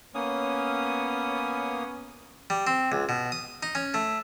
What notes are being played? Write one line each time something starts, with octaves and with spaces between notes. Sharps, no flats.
A#3 B3 C#4 D#6
G3
C4
C#2
B2
D#6
D#4
C#4
A3